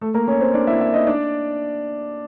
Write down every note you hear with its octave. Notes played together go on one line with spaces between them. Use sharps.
A3 A4
A#3 A#4
C#4 C#5
C4 C5
D4 D5
E4 E5
E4 E5
D#4 D#5
D4 D5